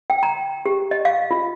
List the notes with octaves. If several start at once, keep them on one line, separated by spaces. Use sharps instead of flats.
G5
A#5
G4
D#5
F5
F4